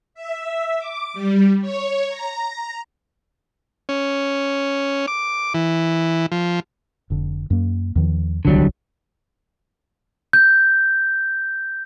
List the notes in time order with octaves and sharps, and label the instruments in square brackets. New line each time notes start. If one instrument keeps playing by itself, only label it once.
[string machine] E5
D6
G3
C#5
A#5
[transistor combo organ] C#4
D6
E3
F3
[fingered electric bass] F1 D3
F#2 A#3
E2 D#3 F3
[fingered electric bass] D1 C2 D#3 [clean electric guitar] D3 F#3 G3
[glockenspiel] G6